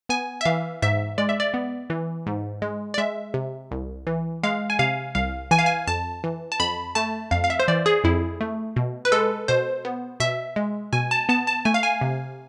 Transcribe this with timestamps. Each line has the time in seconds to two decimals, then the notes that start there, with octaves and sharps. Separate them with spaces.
0.09 B3 G#5
0.41 E5
0.45 E3 F5
0.82 G#2 E5
1.18 G#3 D5
1.29 E5
1.40 D5
1.54 B3
1.90 E3
2.26 G#2
2.62 G#3
2.94 D5
2.98 G#3 E5
3.34 C3
3.71 C2
4.07 E3
4.43 G#3 F5
4.70 G#5
4.79 C3 F5
5.15 C2 F5
5.51 E3 G#5
5.59 F5
5.66 G#5
5.87 F2 A5
6.24 E3
6.52 A5
6.60 F2 B5
6.95 A3 A5
7.31 F2 F5
7.44 F5
7.50 E5
7.60 C5
7.68 E3 D5
7.86 G#4
8.04 F2 E4
8.41 A3
8.76 B2
9.05 B4
9.12 G#3 A4
9.48 B2 C5
9.85 B3
10.20 B2 E5
10.56 G#3
10.93 B2 G#5
11.11 A5
11.29 B3 A5
11.47 A5
11.65 A3 G#5
11.74 F5
11.83 G#5
12.01 C3